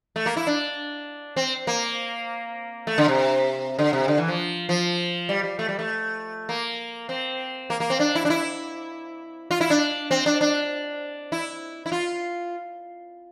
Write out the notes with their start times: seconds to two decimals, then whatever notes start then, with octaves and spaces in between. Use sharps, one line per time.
0.16 A3
0.26 A#3
0.37 E4
0.47 D4
1.36 C4
1.67 A#3
2.87 A3
2.98 D3
3.08 C3
3.79 D3
3.93 C3
4.08 D3
4.18 E3
4.28 F3
4.69 F3
5.29 G3
5.43 G3
5.59 A3
5.69 G3
5.79 A3
6.49 A#3
7.09 C4
7.70 A#3
7.80 A#3
7.90 C4
8.00 D4
8.15 E4
8.25 D4
8.30 E4
9.51 F4
9.61 E4
9.70 D4
10.11 C4
10.26 D4
10.41 D4
11.32 E4
11.86 E4
11.92 F4